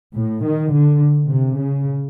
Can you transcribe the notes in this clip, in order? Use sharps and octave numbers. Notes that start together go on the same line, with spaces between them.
A2
D#3
D3
C3
C#3